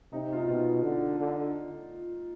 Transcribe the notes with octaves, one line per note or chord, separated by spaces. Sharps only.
C3 D#4
F4
D#4
B2 F4
D3
D3